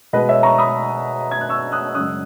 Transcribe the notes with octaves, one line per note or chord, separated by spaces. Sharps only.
B2 G#3 B4 D#5
C#5 E5
A#5 C#6
B5 D#6
G#6
F#6
C#6 E6
D#6 F#6
F#2 C#3 G#3 D#6 F#6